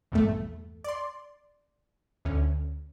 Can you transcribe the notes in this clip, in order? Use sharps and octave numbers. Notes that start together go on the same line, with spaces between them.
A#1 E2 G2 A3
D5 C6
D2 C#4